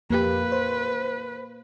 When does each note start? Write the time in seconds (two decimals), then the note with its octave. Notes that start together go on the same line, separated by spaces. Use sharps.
0.11 F2 A#3 G4 B4
0.52 C5